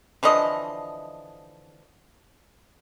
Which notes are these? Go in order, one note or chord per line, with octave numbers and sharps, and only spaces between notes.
D3 E3 F3 D#5